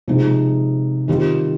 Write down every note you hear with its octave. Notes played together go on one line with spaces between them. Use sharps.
C3 F3 G#3 D#4
D#3 G3 C4 F4